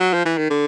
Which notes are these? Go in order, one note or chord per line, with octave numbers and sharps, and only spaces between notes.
F#3
F3
E3
D#3
D3